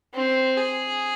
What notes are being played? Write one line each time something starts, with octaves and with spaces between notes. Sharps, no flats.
C4
G#4